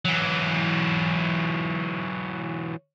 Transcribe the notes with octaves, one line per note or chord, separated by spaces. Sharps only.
E3 F#3